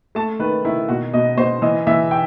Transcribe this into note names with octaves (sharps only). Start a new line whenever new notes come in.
A3 A5
D#3 B4
D#3 E4
B2 F#4
B2 D#5
B2 C5
E3 D#5
E3 E5
G5